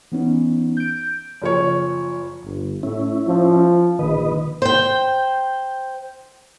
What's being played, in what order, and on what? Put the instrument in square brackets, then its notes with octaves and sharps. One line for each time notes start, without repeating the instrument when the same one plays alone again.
[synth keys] E3 B3 C#4 D#4
G6 D7
[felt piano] F#1 F3 C#5
[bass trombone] G1
[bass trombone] A2 [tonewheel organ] C#4 E4
[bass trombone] F3
[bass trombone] A#1 [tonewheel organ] D#3 B4 D#5
[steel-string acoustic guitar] C5 G5